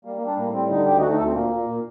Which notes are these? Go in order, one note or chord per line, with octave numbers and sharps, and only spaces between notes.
G3 A#3
A#3
G3
D4
A2 A#3
G3 C4
D3 D#4
D2 G4
D#4
A3 F#4
D#4
D2 A4
C4
A#2 A#3
A#2
A#2